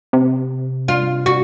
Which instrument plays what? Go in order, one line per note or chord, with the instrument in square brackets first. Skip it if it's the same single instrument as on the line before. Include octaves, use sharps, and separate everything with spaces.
[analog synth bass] C3
[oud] F4
F#4